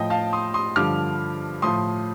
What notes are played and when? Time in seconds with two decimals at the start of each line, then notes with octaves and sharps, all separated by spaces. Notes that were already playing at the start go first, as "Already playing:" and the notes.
Already playing: A2 F3 D#5 G5
0.10 F5 A5
0.33 C6 D#6
0.54 C6 D#6
0.76 G2 D3 F3 D6 F6
1.62 A2 F3 C6 D#6